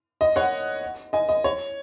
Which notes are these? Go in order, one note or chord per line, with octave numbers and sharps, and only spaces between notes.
D#5
C#5 F#5
D#5 G#5
D#5
C#5